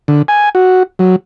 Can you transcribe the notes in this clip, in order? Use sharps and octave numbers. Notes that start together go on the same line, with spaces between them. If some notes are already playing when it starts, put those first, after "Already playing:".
D3
G#5
F#4
F#3